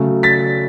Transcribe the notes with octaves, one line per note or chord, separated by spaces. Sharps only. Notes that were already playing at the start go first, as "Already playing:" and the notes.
Already playing: C#3 F#3 A3
A6 B6